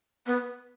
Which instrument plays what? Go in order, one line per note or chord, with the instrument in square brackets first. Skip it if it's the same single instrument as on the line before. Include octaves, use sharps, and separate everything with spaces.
[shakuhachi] B3